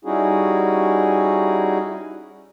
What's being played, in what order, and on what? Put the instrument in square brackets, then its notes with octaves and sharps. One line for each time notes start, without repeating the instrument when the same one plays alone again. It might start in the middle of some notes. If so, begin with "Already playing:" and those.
[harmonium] G3 C#4 D#4 E4 F#4 G#4